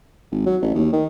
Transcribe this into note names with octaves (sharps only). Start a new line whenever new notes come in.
G#1
F#3
A1
D#2
D#3